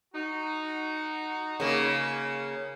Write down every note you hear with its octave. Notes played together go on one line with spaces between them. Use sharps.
D#4 F#4
C#3 A#3